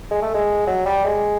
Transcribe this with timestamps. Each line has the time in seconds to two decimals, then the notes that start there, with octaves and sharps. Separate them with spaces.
0.11 G#3
0.22 A3
0.34 G#3
0.67 F#3
0.86 G3
1.05 G#3